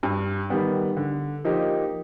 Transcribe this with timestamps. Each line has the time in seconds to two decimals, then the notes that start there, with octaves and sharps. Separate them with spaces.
0.03 G2
0.50 D#3 G3 B3
0.97 D3
1.44 F3 A#3 D#4 G4